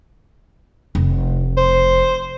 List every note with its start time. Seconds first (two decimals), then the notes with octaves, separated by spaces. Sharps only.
0.95 F1
1.57 C5